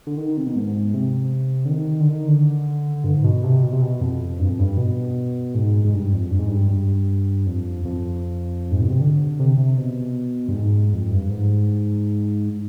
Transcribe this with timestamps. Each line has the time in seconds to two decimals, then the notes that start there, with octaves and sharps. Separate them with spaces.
0.07 D3
0.17 D#3
0.37 C3
0.46 B2
0.56 G#2
0.94 C3
1.65 D3
1.70 D#3
2.00 D3
2.10 D#3
2.28 D3
3.04 G2
3.15 G#2
3.24 B2
3.44 C3
3.63 B2
3.73 C3
3.81 B2
4.01 F2
4.39 G2
4.50 F2
4.59 G2
4.77 B2
5.55 G#2
5.85 G#2
5.93 G2
6.13 F2
6.31 G2
6.39 G#2
6.48 G2
6.70 G2
7.47 F2
7.85 F2
8.71 G#2
8.80 B2
8.90 C3
9.00 D3
9.39 C3
9.58 C3
9.78 B2
10.48 G2
10.54 G#2
10.93 F2
11.11 G2
11.30 G#2